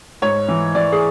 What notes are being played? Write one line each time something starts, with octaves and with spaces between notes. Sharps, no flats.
G#2 C#5
E3
E3 D5
G#4